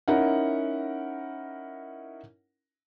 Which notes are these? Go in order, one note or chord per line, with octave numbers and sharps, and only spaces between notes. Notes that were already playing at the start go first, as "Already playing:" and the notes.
C#4 D#4 E4 A#4 F#5